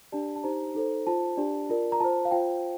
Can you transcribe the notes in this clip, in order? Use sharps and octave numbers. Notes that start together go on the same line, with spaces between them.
D4 G4 D5 A5
A5
D#4 G4 C5 A#5
D#4 A4 C5
F4 C5 A5
D4 G4 D5
F4 A#4 D5
A#5
F4 C5 A5
F5
F4 C5 G5